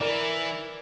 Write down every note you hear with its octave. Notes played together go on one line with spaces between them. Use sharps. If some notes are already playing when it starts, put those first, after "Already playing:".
E3 A#4 D5